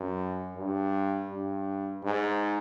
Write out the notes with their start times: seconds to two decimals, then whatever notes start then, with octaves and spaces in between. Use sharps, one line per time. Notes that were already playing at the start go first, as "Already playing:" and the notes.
Already playing: F#2
0.56 G2
1.30 G2
2.03 G#2